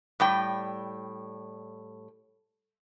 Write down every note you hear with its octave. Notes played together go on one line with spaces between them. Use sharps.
A2 G3 G5